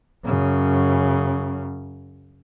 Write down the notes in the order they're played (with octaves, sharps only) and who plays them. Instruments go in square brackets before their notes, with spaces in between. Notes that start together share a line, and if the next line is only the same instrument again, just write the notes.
[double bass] F#2 C#3